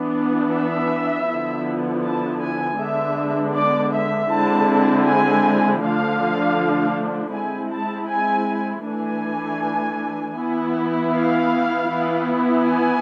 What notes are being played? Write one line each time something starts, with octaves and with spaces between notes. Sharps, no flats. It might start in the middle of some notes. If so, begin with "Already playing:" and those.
Already playing: E3 B3 D4
E5
D3 F3 B3 E4
A5
G#5
D3 G#3 B3 D4 E5
D5
E5
D3 G#3 C4 E4 A5
G#5
D3 F3 A3 D4 F5
G#3 C4 E4 G#5
A5
G#5
E3 A3 D4 G#5
E3 B3 E4
F5
E3 B3 E4
G#5